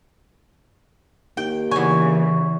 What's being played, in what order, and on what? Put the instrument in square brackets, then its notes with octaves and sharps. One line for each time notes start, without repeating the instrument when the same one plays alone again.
[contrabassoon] D#2 [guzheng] G5
[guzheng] E2 G#5 [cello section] C#3 E3 [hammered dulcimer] C#5